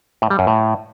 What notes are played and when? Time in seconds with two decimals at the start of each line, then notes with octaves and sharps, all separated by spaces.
0.22 A2
0.30 G3
0.39 F#2
0.47 A2